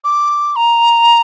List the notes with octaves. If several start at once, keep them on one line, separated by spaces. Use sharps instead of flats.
D6
A#5